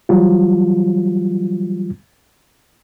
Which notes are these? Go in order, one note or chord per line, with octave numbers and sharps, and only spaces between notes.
E3 F#3 G3 F4